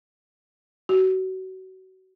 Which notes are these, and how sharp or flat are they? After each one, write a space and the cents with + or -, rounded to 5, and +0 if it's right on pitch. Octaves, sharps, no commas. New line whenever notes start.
F#4 +30